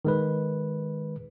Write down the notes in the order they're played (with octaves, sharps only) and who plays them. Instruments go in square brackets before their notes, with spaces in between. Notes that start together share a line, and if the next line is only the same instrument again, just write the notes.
[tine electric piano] D#3 G#3 B4